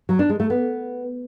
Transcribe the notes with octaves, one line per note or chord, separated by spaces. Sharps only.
F#3
D4
G#3
A3
B3